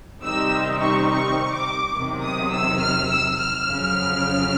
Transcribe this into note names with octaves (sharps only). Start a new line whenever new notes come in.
C3 D#3 G3 C4 D#4 E6
C#6
C#6
D6
E2 C3 D#3 F#3
D#6
E6
F6
E6
F6
F2 C#3 F#3